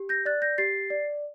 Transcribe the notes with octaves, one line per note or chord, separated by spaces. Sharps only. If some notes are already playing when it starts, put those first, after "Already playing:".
Already playing: G4
G6 A#6
D5 F#6 A6
G6 A#6
G4 A6 C7
D5